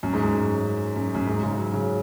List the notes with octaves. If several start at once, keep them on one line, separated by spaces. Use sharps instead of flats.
F#2
G#2
F#2
F#2
F#2
G#2
C#3
F#3
C#3